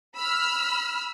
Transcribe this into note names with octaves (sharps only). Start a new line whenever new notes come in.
B5 E6 F6